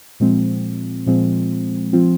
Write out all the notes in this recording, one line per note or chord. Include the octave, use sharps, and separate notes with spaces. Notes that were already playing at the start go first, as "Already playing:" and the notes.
A#2 F3 G#3 C4
A#2 F3 G#3 C4
F3 C4 F4